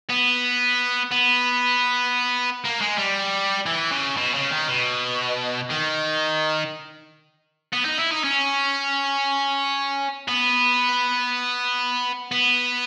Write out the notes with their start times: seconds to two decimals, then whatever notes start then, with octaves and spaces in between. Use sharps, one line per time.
0.10 B3
1.11 B3
2.65 A#3
2.81 G#3
2.98 G3
3.66 E3
3.91 C#3
4.17 B2
4.35 C#3
4.51 D#3
4.68 B2
5.70 D#3
7.73 B3
7.85 D#4
7.98 E4
8.11 D#4
8.24 C#4
10.28 B3
12.32 B3